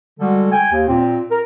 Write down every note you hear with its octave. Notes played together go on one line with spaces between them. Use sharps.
D3 G3 G#3 F#4 A4
G5 G#5
D#2
A#2 C4
A#4